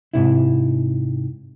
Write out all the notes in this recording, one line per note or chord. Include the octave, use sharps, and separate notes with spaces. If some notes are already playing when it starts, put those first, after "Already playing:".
G#2 C3 E4